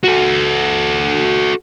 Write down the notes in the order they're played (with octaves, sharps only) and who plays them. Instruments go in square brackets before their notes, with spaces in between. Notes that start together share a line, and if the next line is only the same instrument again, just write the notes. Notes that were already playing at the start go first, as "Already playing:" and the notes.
[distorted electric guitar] F#4 A4